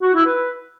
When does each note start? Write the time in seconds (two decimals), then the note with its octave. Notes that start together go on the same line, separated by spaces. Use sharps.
0.01 F#4
0.13 E4
0.25 B4